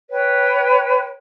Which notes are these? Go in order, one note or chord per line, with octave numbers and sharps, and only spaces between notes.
B4 C#5 G5